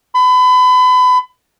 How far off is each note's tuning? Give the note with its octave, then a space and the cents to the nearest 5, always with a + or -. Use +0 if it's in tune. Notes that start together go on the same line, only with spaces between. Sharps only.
B5 +30